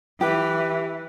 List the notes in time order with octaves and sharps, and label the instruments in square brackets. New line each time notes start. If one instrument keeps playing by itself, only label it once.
[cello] E3 [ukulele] G4 [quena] B4 [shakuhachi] E5